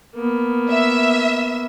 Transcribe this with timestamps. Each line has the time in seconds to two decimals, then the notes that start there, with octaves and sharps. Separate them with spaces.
0.15 A#3 B3
0.69 E5